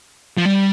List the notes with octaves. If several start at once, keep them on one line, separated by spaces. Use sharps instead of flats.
F3
G3